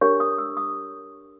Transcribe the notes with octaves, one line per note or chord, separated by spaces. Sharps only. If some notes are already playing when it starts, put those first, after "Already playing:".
D4 G4 A#4 C#5 C#6
D#6
E6
D#6